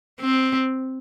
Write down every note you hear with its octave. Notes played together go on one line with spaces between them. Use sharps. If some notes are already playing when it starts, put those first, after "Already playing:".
C4